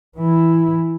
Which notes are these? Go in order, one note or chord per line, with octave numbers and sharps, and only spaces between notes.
E3 E4